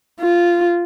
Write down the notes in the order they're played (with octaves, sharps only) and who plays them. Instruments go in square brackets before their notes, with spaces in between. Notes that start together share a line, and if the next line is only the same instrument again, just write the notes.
[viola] F4